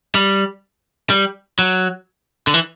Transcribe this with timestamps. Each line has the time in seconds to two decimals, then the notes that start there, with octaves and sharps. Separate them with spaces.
0.15 G3
1.10 G3
1.59 F#3
2.47 D3
2.54 E3